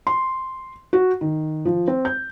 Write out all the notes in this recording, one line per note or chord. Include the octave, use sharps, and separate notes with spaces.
C6
F#4
D#3
F3
C4
G6